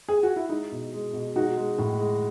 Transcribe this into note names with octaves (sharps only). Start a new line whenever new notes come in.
G#4
F#4
E4
G#3 D#4
B2
G#3
B2
G#3 D#4 F#4
G#3
A2
G#3